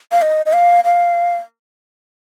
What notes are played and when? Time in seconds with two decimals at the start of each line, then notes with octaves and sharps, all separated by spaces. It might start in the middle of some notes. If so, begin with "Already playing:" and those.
0.12 F5
0.22 D#5
0.46 D#5
0.53 F5
0.84 F5